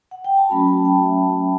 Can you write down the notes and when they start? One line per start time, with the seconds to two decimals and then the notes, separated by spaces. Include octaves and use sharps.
0.11 F#5
0.24 G5
0.37 A5
0.50 F#3 A3 C#4 F#4 B5
0.67 A5
0.85 G5
1.03 E5